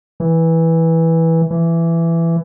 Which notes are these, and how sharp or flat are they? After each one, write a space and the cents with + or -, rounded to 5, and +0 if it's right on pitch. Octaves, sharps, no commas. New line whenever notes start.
E3 -10
E3 +15